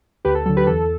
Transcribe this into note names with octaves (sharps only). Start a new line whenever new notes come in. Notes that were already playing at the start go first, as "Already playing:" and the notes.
D2 G4 B4
A4
D3 F#3 A4
G4 B4
E2 A4